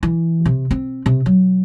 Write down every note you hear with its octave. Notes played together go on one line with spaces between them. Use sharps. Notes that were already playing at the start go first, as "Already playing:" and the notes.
E3
C3
C4
C3
F#3